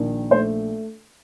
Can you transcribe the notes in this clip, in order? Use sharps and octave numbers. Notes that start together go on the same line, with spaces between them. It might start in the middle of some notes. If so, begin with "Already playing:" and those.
Already playing: A#1 D#3
A3 C5